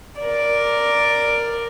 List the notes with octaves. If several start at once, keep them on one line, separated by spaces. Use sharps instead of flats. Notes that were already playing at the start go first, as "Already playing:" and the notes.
A#4 D5